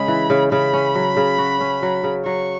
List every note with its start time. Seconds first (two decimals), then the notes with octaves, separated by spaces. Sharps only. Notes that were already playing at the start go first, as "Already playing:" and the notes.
Already playing: C#3 G#3 B5
0.08 E3
0.30 C#3
0.52 C#3 B5
0.74 C#4
0.95 F#3
1.17 C#3
1.38 F#4
1.61 C#4
1.83 F#3
2.04 C#3
2.26 F#3 C#6